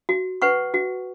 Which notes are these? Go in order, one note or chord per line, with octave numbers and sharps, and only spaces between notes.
F#4
B4 F#5 C#6
F#4